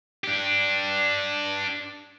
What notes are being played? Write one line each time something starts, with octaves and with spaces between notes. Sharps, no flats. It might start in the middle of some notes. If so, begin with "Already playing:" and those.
D4 G4